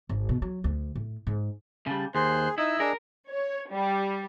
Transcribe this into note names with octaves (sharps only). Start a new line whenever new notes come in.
G#1
B2
F#3
D2
A2
G#2
C#3 G3 A5
D#2 G#4 C5 C6 F#6
D#4 E4 D#5 E6
D4 G#4 A#4
C#5
G3